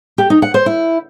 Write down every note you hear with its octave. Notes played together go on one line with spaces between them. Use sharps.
G4
D#4
F#5
C5
E4